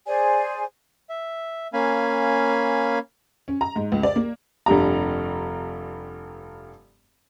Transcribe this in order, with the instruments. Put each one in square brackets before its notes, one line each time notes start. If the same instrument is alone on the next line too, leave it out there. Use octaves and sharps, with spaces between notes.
[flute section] G#4 C5 D5 G#5
[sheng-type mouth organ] E5
A#3 C#4 F5 G#5 B5
[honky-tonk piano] C#4
A#5
G#2
C#2
D5
A#3
[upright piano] F1 G2 G3 A#5